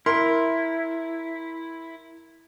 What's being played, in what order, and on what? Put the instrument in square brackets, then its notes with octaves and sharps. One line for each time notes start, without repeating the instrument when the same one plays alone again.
[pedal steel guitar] E4 [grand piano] A#4 C6